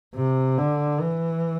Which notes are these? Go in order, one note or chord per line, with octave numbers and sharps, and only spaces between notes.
C3
D3
E3